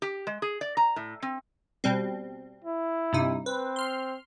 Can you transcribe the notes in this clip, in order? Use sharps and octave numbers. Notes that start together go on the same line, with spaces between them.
G4
G#3
G#4
D5
A#5
A2
C4
B2 G3 C4
E4
G2 C3 D#4
C4 B4
C6 F6